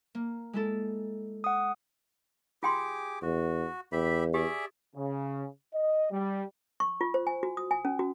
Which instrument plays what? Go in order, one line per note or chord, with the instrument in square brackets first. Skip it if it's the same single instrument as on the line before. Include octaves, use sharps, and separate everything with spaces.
[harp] A#3
G#3 E4 A4
[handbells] F#5 D#6
[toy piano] F4 G5 C6 [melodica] G4 G#4 D6
[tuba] E2 [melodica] F#4
[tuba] E2 [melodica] G4 E5 B5
[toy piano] G4 [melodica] G#4 D5 E5
[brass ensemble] C#3
D#5
G3
[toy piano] C#6
F4
C5
G#5
F#4
D#6
G#5
C#4
F#4